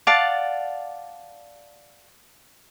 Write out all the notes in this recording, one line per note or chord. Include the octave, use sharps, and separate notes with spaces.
D5 F5 F#5 A5